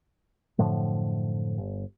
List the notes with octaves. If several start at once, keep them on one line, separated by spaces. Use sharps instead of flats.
F#2 A2 D3 F3
G1